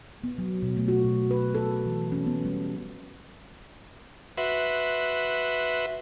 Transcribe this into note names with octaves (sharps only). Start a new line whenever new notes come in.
B3
F#3
B2
A3
F#4
B2
B4
A4
E3
C#4
B3
G3
F#4 B4 E5 C6